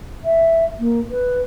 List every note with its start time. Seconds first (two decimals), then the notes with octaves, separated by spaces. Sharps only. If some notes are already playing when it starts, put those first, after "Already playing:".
0.24 E5
0.79 A#3
1.10 B4